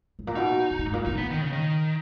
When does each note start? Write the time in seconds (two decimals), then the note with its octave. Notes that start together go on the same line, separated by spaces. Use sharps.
0.19 G#2
0.27 A#2
0.35 B2 D#4
0.70 B2
0.79 A#2
0.85 G#2
0.93 A#2
1.06 A#2 D#4
1.18 B3
1.30 D#3
1.42 C#3
1.53 D#3